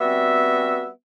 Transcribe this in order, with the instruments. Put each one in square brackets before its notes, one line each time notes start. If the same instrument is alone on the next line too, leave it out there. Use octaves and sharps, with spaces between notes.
[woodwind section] G3 B3 C4 F#4 E5